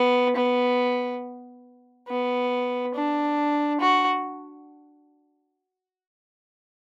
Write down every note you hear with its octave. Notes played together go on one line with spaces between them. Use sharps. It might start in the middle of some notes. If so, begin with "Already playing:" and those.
Already playing: B3
B3
B3
D4
F#4